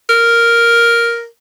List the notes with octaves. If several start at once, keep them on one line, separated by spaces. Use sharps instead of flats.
A#4